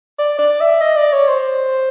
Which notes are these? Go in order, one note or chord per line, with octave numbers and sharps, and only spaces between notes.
D5
D5
E5
D#5
D5
C#5
C5